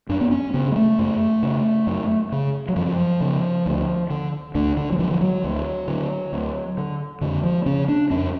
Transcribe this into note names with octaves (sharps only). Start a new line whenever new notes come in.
F#2 D4
B3
C#4
C#3 B3
G#3
A3
F#2
C#3
F#2
C#3
F#3
F#2 F3
C#3
D2
D3
D2 D3
D3
F#3
D3 F3
F3
F#3
D2
D3
D2
D3
F2 D3
F3
C#3 C#4
D4
F2 C#4